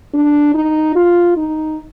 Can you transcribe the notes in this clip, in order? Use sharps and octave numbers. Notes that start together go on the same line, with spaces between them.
D4
D#4
F4
D#4